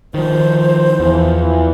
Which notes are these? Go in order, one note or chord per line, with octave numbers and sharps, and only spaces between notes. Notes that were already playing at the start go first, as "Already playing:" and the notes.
D#3 F3 C5
E2 E3 F3